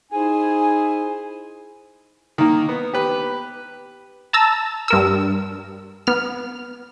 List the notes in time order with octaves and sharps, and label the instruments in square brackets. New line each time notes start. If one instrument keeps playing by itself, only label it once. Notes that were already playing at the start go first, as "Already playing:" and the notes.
[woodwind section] D#4 E4 G#5 [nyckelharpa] G#4 C5
[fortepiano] D#3 A#3
B3
G4 B4
[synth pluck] A5 A#5 E6 A6
G2 A#4 E6
B3 F6